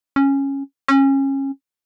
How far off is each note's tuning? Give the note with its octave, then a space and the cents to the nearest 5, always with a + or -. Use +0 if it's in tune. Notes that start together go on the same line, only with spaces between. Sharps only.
C#4 -10
C#4 -25